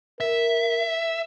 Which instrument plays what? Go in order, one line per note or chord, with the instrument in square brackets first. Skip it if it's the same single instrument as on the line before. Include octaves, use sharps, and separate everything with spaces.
[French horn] A#4 [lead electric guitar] E5